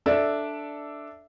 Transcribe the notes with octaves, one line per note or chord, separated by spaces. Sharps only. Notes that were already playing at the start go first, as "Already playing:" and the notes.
D4 A4 D5 E5